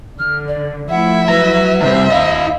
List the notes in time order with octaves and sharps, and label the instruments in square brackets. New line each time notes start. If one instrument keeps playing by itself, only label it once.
[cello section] D3 [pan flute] F6
[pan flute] D5
[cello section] F3 A3 E4 [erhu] E5 [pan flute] F#5
[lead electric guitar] F#3 A#5 [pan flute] B4
[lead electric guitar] C2 D#3 [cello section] C5 [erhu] E5
[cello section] D#2 [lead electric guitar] E4 D#5 [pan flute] F5